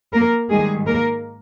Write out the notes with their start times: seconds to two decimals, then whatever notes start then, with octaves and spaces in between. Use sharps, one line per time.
0.14 A#3 A#4
0.50 G#2 D#3 G3 G#3 G#4
0.86 A#3 A#4